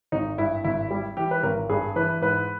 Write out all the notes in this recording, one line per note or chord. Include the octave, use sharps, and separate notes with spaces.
G#1 D#4
G2 E4
G#1 E4
G3
E3 G4
B4
G#1 A#4
G2 G#4
E3 B4
G#2 B4